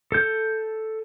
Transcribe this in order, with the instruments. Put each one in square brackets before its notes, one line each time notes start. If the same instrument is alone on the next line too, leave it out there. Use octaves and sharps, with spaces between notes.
[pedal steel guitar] A4 G6